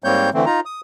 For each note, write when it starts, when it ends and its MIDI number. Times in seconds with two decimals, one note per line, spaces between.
0.04 0.30 44
0.04 0.30 55
0.04 0.30 58
0.04 0.30 60
0.04 0.30 73
0.04 0.30 91
0.34 0.45 50
0.34 0.45 52
0.34 0.45 57
0.34 0.45 60
0.46 0.60 63
0.46 0.60 65
0.46 0.60 82
0.65 0.81 87